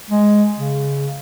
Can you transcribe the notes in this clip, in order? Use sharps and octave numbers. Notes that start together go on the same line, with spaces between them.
G#3
C#3